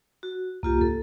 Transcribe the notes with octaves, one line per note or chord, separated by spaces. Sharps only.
F#4
C2 A#3 F4 G4
C#2 A4